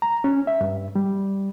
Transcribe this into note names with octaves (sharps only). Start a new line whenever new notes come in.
A#5
C#4
E5
G2
G3